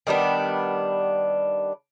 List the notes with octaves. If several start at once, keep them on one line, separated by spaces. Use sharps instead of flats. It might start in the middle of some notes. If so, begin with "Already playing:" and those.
D#3 G3 B3 D4